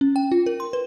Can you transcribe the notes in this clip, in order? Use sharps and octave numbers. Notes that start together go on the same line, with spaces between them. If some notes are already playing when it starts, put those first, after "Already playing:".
C#4
G5
F4
A#4
C6
B4